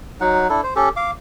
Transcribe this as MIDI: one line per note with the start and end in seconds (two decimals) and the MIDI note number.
0.21 0.48 54
0.21 0.48 63
0.21 0.48 78
0.50 0.61 62
0.50 0.61 64
0.50 0.61 69
0.63 0.74 72
0.76 0.89 61
0.76 0.89 67
0.76 0.89 69
0.96 1.11 77
0.96 1.11 86